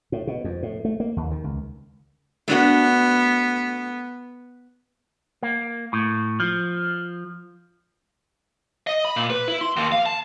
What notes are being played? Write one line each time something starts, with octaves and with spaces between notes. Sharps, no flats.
A2
B2
F2
A2
A3
A#3
D#2
D#3
C#2
A3 B3 D4 F#4
A#3
A2
F3
D#5
B5
A#2
B4
E4
C6
D#2
F5
A5